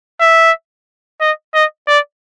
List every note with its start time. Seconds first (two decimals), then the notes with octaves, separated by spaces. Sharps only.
0.21 E5
1.21 D#5
1.54 D#5
1.88 D5